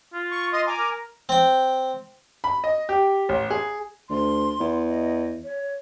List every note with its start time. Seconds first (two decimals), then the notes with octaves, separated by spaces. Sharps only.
0.14 F4
0.32 C#6
0.53 D#5 C6 D#6
0.67 G#5 A#5 D6
0.78 A#4
1.29 C4 G5
2.44 B5
2.64 D#5
2.89 G4
3.29 A1
3.51 G#4
4.10 D2 C6
4.60 E2
4.88 D#5
5.44 C#5